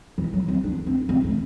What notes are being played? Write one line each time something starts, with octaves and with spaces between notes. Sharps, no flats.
E3
F#3
C4
D4
C4
C4
A3